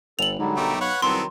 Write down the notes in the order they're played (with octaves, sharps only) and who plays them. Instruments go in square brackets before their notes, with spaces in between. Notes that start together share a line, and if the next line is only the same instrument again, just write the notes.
[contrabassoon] G1 [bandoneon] A4 [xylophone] F7 F#7
[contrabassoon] G#2 [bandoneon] D3 F#3 G3
[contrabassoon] B1 [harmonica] A3 G4 A#4
[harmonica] B4 C#5 F#5 [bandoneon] F5
[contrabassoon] C2 [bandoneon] D#3 F#3 [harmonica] B3 C4 A4 [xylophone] C6